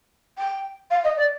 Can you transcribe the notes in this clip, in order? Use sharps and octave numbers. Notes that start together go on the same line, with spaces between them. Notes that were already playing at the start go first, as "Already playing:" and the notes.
G5
F5
D#5
D5